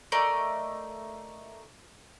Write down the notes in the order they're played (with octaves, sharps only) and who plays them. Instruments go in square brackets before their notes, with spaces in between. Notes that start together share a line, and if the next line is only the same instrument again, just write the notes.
[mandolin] A3 A#4 D5 D#5